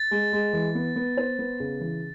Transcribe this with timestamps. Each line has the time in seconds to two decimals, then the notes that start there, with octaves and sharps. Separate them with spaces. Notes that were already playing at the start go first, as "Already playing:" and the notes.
Already playing: A6
0.11 G#3
0.33 G#3
0.53 E3
0.75 B3
0.96 B3
1.17 C5
1.39 B3
1.60 C#3
1.81 E3